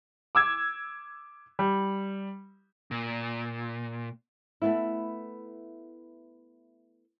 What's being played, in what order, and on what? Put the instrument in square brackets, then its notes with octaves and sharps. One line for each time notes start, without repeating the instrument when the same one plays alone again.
[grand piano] D6 E6 G#6
G3
[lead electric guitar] A#2
[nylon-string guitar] A3 B3 E4